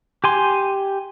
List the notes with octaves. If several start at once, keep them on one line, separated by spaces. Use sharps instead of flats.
G4 G#5 C6